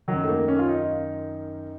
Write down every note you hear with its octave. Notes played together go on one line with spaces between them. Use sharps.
D#3 F#3
F#2
A3
A#3
C#4
F4
D#4